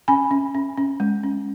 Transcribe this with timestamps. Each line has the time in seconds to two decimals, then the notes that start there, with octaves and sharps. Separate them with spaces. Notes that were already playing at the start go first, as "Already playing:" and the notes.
0.08 C#4 G#5 B5
0.31 C#4
0.54 C#4
0.77 C#4
1.00 G#3
1.23 C#4